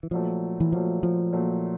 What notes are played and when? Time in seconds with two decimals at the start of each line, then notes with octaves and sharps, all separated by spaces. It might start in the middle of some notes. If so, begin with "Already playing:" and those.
0.03 E3
0.11 A#2 F3 F#3 A3
0.60 E3
0.72 A#2 F3 F#3 A3
1.03 F3
1.33 A#2 F#3 A3